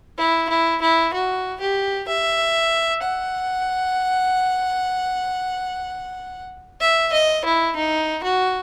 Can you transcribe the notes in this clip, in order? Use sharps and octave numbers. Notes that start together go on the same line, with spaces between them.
E4
E4
E4
F#4
G4
E5
F#5
E5
D#5
E4
D#4
F#4